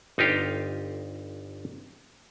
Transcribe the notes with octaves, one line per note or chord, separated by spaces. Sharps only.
G1 D#4 F4 G4 F5